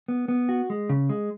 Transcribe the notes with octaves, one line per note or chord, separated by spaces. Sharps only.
B3
B3
F#4
G#3
C#3
G#3